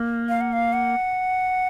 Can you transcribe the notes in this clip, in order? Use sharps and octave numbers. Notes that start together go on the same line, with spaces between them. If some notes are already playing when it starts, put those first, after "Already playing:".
Already playing: A#3
F5
F#5
F5
F#5